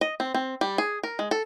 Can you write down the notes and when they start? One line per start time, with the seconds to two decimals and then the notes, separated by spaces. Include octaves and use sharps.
0.01 D#5
0.20 C4
0.34 C4
0.61 G3
0.78 G#4
1.03 A#4
1.19 G#3
1.31 A4